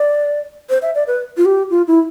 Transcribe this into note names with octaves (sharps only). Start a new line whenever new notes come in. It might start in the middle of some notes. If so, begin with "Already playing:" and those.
Already playing: D5
C5
E5
D5
B4
F4
G4
F4
E4